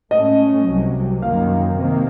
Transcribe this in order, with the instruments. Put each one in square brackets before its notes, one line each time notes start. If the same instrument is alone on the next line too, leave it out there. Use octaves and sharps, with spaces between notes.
[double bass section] A2 A3 C#4 [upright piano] D#5
[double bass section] C2 C3 F#3
[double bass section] F#2 D#3 A#3 [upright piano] F5
[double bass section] C3 D#3 A#3